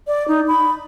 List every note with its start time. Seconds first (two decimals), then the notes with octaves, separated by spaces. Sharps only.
0.07 D5
0.28 D#4
0.48 B5